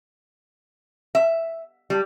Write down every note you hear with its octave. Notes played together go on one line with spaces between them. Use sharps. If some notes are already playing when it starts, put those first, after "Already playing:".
E5
G3